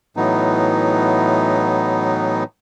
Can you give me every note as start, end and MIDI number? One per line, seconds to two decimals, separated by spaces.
0.17 2.44 45
0.17 2.44 52
0.17 2.44 54
0.17 2.44 59
0.17 2.44 63